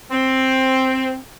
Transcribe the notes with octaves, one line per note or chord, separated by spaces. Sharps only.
C4